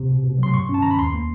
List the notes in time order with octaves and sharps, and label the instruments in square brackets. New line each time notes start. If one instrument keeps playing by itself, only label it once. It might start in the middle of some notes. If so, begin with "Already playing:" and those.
Already playing: [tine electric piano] C3
B2
B2
F#3 C6
G2 C#6
C#4
A5
D#3 A#5
B5
D#2 C6
A#3